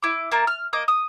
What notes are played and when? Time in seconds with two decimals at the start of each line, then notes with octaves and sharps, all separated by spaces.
0.03 E4 D6
0.32 A#3 A#4 A5
0.47 F6
0.73 A#3 D#5 D6
0.88 D#6